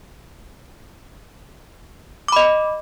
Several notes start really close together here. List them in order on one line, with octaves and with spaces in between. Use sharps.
D6 B5 D#5